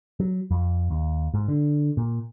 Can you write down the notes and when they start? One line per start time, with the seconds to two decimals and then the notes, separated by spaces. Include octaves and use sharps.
0.20 F#3
0.51 F2
0.91 D#2
1.34 G#2
1.48 D3
1.97 A#2